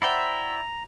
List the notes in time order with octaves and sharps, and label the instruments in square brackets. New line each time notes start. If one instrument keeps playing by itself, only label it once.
[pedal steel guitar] E4 D5 G5 [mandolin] F#4 C5 E5 [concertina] A#5